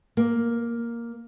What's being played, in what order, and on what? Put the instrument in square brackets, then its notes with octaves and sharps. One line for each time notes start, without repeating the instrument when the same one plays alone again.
[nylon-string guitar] A#3